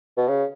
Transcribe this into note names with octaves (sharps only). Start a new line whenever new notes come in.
B2
C#3